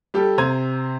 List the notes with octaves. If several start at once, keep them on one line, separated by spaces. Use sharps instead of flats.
G3 G4 A4
C3 C5 A#5 G#6 D#7